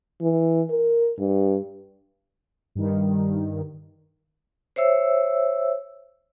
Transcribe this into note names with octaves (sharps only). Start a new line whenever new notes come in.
E3
A#4
G2
G2 D#3
C5 C#5 E5 E6